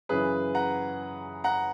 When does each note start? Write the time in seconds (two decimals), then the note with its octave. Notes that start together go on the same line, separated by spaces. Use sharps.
0.09 F#2 C#3 E3 G#4 B4
0.55 F#5 A#5
1.44 F#5 A#5